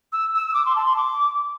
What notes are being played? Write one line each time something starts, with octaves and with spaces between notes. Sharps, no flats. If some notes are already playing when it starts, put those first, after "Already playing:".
E6
E6
E6
D6
C6
A5
C6
D6